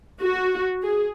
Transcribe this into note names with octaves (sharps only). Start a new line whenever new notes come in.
F#4
G#4